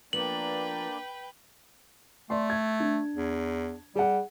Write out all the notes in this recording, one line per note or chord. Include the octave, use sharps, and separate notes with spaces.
F3 A#3 B3 D4 B4 D5 G5 F#7
A3 D5 C6
G#6
D4
E2
G3 G#4 F#5